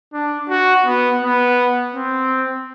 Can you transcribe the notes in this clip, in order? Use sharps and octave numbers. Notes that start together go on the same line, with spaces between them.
D4
F#4
B3
B3
C4